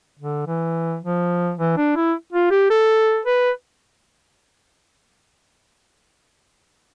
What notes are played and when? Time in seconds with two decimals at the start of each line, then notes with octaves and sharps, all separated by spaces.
0.19 D3
0.47 E3
1.02 F3
1.58 E3
1.77 D4
1.96 E4
2.33 F4
2.51 G4
2.70 A4
3.26 B4